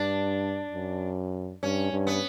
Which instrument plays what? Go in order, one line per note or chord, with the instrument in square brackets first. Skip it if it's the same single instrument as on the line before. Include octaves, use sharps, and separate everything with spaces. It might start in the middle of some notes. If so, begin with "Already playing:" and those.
Already playing: [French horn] G2 [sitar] D4
[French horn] F#2
[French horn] G2 [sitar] C#4
[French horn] G2
[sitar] B3